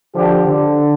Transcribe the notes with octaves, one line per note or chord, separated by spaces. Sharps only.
D3 F3 G4
D3